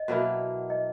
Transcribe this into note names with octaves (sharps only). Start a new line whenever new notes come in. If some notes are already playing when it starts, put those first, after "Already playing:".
Already playing: D#5
B2 F#3 A#3 E4
D#5